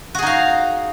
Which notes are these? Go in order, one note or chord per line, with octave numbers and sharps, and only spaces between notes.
D#4 F#4 G#4 F5